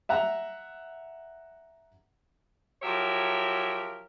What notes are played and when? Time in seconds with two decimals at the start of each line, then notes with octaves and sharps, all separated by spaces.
0.09 E5 F#5 A#5
2.82 F3 F#3 G4 A#4 C#5 E5